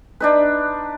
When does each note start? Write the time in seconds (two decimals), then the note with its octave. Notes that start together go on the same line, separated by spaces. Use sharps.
0.20 D4 D#4 B4